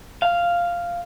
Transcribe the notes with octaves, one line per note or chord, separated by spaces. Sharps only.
F5